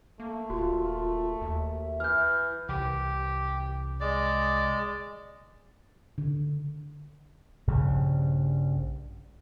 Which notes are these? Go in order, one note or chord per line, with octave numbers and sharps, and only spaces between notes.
A3 A#3
D#1 F4 F#4
D#2 E5
E3 F6 G6
C2 E3 G4
G#3 D5
D3
A#1 G2 C#3